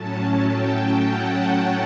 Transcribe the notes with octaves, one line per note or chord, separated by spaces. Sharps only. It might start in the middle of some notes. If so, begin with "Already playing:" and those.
Already playing: A2 F#3 C#4 A5
A5
G5
F#5
G5